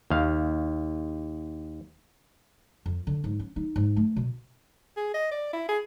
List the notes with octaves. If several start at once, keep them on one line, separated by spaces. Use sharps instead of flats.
D#2 F5
F2
D3
G#2
C#4
D#4
G#2
A3
B2
G#4
D#5
D5
E4
G#4